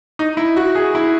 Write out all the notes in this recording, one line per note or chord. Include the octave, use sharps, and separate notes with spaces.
D#4
E4
F#4
G#4
E4